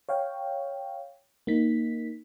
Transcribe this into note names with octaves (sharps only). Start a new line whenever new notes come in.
C#5 F5 G5
A#3 D#4 B6